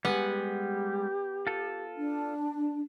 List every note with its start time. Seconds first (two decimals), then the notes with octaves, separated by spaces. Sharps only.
0.05 G3 G#3 B3 G4 F#5 G#5
1.47 F4 A4
1.97 D4